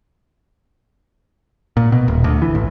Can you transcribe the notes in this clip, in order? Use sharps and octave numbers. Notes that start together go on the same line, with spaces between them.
A#2
B2
D#1
D2
E3
A1